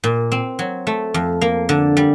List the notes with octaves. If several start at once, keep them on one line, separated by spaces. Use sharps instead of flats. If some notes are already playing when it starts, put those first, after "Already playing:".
A#2
C4
F#3
A3
F2
A#3
D3
G3